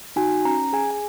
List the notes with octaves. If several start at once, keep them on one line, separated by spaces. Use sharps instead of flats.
D#4 F#4 G#5
C#4 A#5
G#4 G#5
G#5